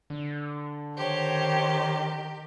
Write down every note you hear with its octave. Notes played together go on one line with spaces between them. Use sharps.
D3
D#3 G4 C5 C#5